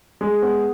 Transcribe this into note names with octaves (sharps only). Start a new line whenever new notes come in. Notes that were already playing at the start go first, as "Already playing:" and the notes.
G#3
B3